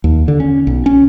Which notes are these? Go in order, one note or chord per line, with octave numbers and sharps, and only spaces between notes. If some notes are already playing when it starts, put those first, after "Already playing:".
D#2
D3
C#4
B1
C#4